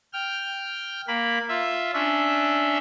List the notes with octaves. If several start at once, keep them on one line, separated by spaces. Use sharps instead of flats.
G5 F6
A#3 B5
F4 E5
C#4 D4 E5